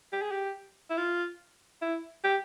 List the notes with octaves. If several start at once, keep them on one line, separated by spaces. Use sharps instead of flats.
G4
G#4
G4
E4
F4
E4
G4